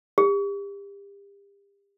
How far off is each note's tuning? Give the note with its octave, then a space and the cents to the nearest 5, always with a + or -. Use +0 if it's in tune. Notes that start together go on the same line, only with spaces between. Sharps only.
G4 +35